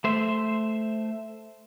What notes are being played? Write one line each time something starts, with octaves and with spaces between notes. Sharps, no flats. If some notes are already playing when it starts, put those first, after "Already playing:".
A3 C5 E5